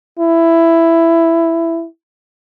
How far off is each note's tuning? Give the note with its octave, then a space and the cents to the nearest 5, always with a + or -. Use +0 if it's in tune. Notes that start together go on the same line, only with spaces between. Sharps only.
E4 +10